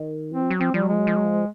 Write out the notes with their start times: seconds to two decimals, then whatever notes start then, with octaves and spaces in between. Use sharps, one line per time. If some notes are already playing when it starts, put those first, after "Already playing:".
Already playing: D#3
0.32 E3 C4
0.42 F3
0.50 F#3
0.60 F3 C4
0.74 F3 G3
0.82 F#3
0.88 F3 G#3
0.98 F#3
1.07 F3
1.16 F#3
1.25 F3